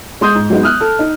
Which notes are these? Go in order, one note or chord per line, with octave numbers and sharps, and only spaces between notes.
G#3 C6 D#6 G6
G#2
F#3 G#3 B3 D#4
D#6 F6 F#6
A4
D#4